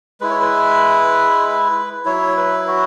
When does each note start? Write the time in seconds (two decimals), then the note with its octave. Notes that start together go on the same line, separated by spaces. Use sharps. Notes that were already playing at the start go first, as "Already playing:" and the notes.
0.21 G#3 E4 B4
0.30 C#5
0.40 B4
2.05 F#3 E4 C#5
2.36 B4
2.67 F#4